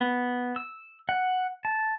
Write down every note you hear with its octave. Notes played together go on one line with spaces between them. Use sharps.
B3
E6
F#5
A5